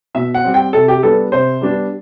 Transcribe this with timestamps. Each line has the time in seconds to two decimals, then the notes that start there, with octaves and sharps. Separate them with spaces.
0.15 B2 E5
0.34 F#5
0.44 G3 C4
0.54 G5
0.73 C3 A4
0.88 G4
1.03 G3 B3 D4 A4
1.32 C3 C5
1.61 G3 B3 D4